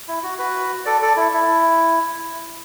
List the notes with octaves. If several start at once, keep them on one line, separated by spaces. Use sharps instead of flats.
E4
F#4
F#4 B4
A4 D5
A4 D5
E4
E4